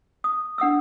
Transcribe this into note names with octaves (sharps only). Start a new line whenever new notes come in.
D#6
D4 F#5 D#6 E6